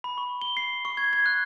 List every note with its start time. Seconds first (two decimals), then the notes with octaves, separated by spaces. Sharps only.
0.04 B5
0.18 C#6
0.41 G7
0.57 C7
0.85 C#6
0.97 G#6
1.13 G#6
1.26 F#6